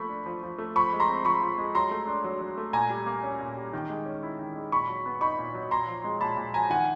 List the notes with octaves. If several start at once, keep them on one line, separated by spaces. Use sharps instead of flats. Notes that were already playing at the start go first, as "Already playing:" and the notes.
Already playing: F3 A3 A#3 B5 C#6
D4
F3
F3
A3
F3 B5 C#6
G#3
A#5 C6
C4
F3 B5 C#6
F3
G#3
F#3 A#5 C6
A3
D4
F#3
F#3
A3
A#2 G#5 A#5
G3
A#3
C#4
A#2
G3
D#3
G#3
C#4
E4
D#3
G#3
A#2 B5 C#6
F#3
B3
D#4 B5 C#6
A#2
F#3
A#2 A#5 C6
F3
G#3
A#2 A5 B5
A#2
F3 G#5 A#5
D#3 F#5 G#5